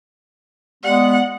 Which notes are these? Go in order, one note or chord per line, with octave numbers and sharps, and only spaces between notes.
G3 G#3 B3 F#5